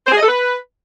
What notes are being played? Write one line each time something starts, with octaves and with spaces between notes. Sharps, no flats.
C5
G#4
D#5
A4
B4